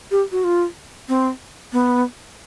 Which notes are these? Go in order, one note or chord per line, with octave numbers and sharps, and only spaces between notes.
G4
F#4
F4
C4
B3